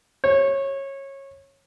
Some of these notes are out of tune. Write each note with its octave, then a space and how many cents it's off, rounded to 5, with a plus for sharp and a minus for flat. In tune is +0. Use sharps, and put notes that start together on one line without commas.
C#5 -20